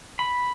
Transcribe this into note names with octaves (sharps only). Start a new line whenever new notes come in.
B5